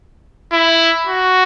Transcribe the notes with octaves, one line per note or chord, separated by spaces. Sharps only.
E4
F#4